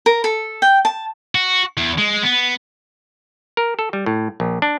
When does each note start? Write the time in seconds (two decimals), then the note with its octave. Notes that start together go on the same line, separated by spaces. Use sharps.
0.06 A#4
0.24 A4
0.62 G5
0.85 A5
1.35 F#4
1.77 E2
1.98 G#3
2.23 B3
3.57 A#4
3.79 A4
3.93 G3
4.06 A2
4.40 A#1
4.62 D4